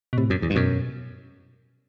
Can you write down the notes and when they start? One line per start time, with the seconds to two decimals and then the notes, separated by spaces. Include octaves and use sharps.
0.13 B2
0.18 A2 C3
0.30 F#2
0.42 E2
0.50 G2
0.55 F#2 B2